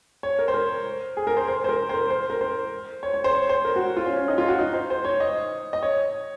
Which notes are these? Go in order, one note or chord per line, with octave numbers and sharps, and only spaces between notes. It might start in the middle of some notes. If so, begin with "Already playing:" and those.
C#5
A#4
C5
A#4
G#4
A#4
C5
C5
C5
A#4
C5
A#4
C5
A#4
C5
C#5
C#5
C5
C#5
C5
A#4
F#4
F4
C#4
C#4
D#4
F4
F#4
D#4
C5
C5
C#5
D#5
D#5
C#5